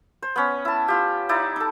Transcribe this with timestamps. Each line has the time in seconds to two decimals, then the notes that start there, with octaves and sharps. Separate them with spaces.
0.22 C5
0.36 B3 C#4
0.65 E4 A5
0.88 F4 G4
1.29 D#4 E4 D5
1.56 D#4 A4